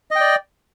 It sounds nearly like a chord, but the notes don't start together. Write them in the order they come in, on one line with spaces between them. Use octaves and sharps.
D#5 G5 D5